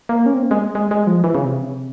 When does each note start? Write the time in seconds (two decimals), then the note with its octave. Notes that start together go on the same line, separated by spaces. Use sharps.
0.09 A#3
0.26 C#4
0.34 C4
0.43 A#3
0.51 G#3
0.75 G#3
0.91 G#3
1.07 F3
1.24 E3
1.35 C#3
1.45 C3